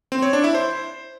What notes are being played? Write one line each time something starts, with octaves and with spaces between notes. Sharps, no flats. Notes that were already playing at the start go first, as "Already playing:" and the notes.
C4
C#5
D4
E4
C5